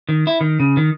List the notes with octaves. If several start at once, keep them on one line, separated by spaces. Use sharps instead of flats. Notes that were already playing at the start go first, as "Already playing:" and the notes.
D#3
E4
D#3
C#3
D#3